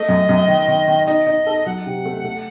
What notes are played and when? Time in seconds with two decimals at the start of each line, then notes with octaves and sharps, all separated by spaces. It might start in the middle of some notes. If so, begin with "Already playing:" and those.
Already playing: A3 D#5
0.09 F#2
0.29 F#2
0.48 D#3
0.68 D#3
0.88 D#3
1.07 D#4 D#5
1.26 D#4
1.47 A4
1.66 F#3 F#5
1.86 C3
2.05 A3
2.24 A3